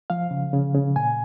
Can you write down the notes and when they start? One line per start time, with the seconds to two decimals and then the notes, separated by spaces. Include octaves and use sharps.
0.10 F3 F5
0.31 C#3
0.53 C#3
0.74 C#3
0.96 A#2 G#5